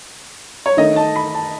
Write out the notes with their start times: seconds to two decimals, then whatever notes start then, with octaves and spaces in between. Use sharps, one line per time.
0.66 C#5
0.77 D#3 A3 D#4 D#5
0.96 A5
1.16 B5
1.34 A5